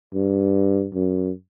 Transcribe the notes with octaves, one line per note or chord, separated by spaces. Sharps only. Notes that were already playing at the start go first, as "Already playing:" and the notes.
G2
F#2